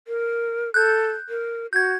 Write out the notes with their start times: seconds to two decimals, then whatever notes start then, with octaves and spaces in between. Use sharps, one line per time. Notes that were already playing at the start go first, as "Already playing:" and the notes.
0.08 A#4
0.74 A4 F#6 G6
1.29 A#4
1.73 F#4 G6 G#6